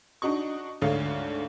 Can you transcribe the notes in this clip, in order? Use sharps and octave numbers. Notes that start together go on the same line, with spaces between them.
D4 D#4 F#4 D#5 C#6
D2 G#2 D3 A3 C#5 F5